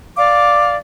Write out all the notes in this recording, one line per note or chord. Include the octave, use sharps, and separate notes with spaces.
D5 F5 D6